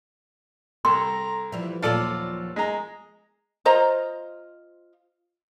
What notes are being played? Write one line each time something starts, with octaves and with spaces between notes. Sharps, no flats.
C2 A4 A#5 C6
E3 F3 G3
D#2 A#2 F#3 F4 A4 D5
G#3 A#5
F4 C5 D#5 A#5